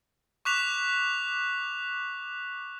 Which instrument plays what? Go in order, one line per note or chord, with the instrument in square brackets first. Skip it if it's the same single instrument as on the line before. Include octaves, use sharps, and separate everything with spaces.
[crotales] C#6 D6 F#6 B6 E7 F7